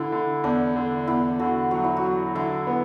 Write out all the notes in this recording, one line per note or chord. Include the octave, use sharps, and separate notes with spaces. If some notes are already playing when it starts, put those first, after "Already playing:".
Already playing: D3 E4
D3
E2 D4
D3
E2 E4
D3 F#4
F#3 F#4
E4
F#4
F#3
D3 E4
B3